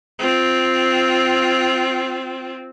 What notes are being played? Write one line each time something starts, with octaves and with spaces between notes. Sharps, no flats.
C4 F4